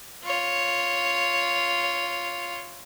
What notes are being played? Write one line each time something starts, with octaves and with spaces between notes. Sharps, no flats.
F4 C#5